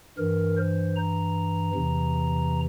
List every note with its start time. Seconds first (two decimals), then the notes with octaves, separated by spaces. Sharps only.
0.18 G2 E3 A#4
0.57 C5
0.96 A#5
1.75 E2 C3 E3